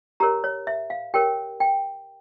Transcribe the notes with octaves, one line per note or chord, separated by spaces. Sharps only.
G4 A#4 C#5 A#5
C#5
E5
F5
G4 A#4 C#5 G5
G5